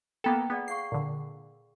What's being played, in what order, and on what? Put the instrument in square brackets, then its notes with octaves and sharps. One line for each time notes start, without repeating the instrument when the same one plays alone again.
[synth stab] A#3 B3 A4 [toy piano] G5 A#5 B5
[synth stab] B3 [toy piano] G#4 D5 F#5
[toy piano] G#4 F5 C#6 [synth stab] C7
[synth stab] A#2 D3